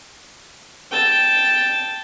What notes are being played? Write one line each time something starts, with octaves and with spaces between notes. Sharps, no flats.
G5 A5